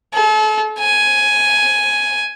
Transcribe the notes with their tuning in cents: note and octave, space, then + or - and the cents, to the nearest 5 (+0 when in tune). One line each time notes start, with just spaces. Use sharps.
A4 -40
G#5 +5